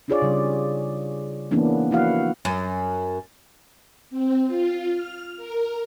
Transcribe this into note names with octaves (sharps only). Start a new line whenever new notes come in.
D4 D#4 F4 G#4 C#5 D5
C#3 G3
E3 A#3 B3 C#4 D4 E4
F3 A#3 E4 F#4 F5 F#5
F#2
C4
F4
F6
A#4